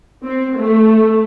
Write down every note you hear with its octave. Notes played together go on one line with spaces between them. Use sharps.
C4
A3